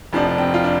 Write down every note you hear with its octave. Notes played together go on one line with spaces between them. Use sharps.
F1 F2 F3 D4
D4
C4
F4
D4